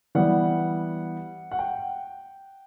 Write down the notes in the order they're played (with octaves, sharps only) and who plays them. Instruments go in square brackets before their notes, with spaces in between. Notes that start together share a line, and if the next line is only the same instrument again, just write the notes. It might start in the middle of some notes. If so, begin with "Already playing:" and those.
[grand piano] E3 G3 B3 [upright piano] F#5
[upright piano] F#5
G5